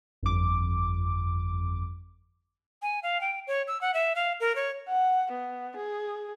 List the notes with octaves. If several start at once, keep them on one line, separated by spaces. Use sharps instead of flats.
G1 F2 D6
G#5
F5
G5
C#5
E6
F#5
E5
F5
A#4
C#5
F#5
B3
G#4